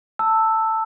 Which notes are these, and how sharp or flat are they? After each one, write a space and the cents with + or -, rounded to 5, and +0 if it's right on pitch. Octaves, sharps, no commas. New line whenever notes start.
A5 +15 E6 +0